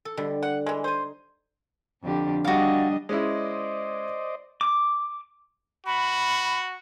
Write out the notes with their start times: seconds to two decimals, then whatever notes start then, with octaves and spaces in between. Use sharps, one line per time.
0.05 A4
0.17 B2 D3 G3
0.43 F#5
0.66 E3 G#3
0.84 D#4 C5 G#5
2.02 F2 D3 G4
2.45 G3 D4 F#4 D#5 F5
3.09 G#3 C#4 E4 C5 D5 D#5
4.61 D6
5.87 F#4 B5